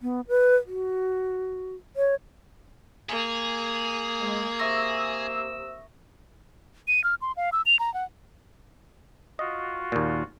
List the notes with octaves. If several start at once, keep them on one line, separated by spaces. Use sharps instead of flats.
B3
B4
F#4
C#5
A#3 G#4
G#3
C3 E5 C#6 D#6 E6 A#6
D#7
F6
C6
F5
E6
F7
A#5
F#5
F4 F#4 D#5
D#2 A#2